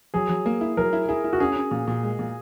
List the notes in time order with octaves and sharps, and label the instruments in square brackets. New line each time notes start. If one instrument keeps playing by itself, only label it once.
[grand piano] F#3 [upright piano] G#4
[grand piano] F#3
A#3
E4
[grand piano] F#3 [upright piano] A#4
[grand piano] E4
[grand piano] E4 [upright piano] G#4
[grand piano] E4
[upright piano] F#4
[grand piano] C#4 [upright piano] G#4
[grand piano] C#4
A#2
A#2
G#3
A#2